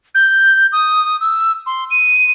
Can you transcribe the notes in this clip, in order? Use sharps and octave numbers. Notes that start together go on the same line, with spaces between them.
G6
D#6
E6
C6
D#7